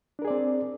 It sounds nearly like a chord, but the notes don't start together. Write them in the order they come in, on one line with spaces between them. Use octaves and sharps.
D4 A#4 G#4 D5 C4